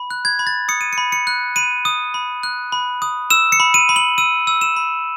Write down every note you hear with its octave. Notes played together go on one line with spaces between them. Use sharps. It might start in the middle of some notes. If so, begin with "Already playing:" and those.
Already playing: B5
F#6
G#6
B5
A6
D#6 C#7
D#7
C#7
B5
C#7
F#6
B5 D#7
D#6
B5
F#6
B5
D#6
E6 E7
C#7
B5
D#7
B5
F#7
E6 D#7
E6
E7
B5